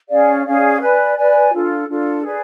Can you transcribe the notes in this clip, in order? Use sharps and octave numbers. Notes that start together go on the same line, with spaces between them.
C#4 G#4 D5 F5
C#4 G#4 D5 F5
B4 D5 G#5
B4 D5 G#5
D4 F4 A4
D4 F4 A4
G#4 B4 D5